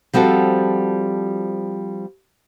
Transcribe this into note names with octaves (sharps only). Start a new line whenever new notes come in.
F3 G3 C4 F#4 A4